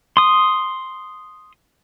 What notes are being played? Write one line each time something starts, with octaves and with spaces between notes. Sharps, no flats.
C6 D#6